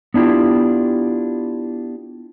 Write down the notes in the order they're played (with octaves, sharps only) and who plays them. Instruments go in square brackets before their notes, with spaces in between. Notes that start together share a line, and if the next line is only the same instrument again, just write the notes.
[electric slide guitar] B3 D4 E4 F4 G4